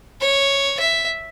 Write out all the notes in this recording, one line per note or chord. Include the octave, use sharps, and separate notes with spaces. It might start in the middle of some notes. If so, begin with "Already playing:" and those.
C#5
E5